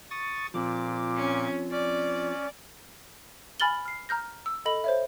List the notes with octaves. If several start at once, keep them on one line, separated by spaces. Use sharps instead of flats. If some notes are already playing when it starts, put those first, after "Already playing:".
C#6 D#6 A6
A#2 F3 C4 D6
C#4
C#4 D5
G#5 B5 F6 A6 F#7 G7
F6 C7
A#5 F6 G6 A#6
E6
A4 D#5 B5 F#7
C5 C#5 E5